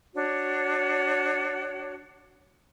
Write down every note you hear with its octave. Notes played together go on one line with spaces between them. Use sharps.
D4 F#4 C#5